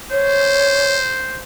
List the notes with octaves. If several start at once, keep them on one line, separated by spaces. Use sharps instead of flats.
C5 C#5